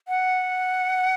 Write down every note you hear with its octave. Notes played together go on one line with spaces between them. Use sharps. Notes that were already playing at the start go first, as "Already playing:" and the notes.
F#5